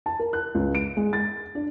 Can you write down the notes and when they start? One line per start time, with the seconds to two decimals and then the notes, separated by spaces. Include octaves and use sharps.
0.06 A5
0.19 A#4
0.33 F#6
0.55 C#2
0.75 D7
0.97 G#3
1.13 A6
1.55 D4